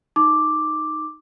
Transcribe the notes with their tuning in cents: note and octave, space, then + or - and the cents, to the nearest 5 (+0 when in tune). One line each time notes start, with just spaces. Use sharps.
D#4 +0 D6 +0